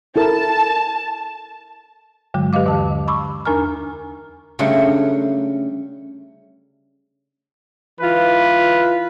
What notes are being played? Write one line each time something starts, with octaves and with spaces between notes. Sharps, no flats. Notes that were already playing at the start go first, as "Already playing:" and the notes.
E4 A4 A#4 A5
G2 D3 F#3 G#3
G4 B4 D#5 F5 D6
D#2 D3 E3 A5
B5 C#6 D6 E6
E2 D4 A#4 G#5 A#5 F6
C#3 F#3 G3 A3 D4
E3 F4 B4